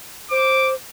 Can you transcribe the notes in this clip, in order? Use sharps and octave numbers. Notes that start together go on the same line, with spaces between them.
C5 D6